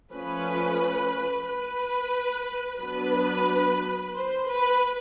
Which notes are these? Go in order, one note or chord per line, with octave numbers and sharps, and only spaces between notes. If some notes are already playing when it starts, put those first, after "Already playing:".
F3 A3 C#4 B4
B4
F#3 B3 D4 B4
C5
B4